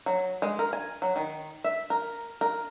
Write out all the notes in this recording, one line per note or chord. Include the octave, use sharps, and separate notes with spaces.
F#3
G#3
A#4
G#5
F#3
D#3
E5
A#4
A#4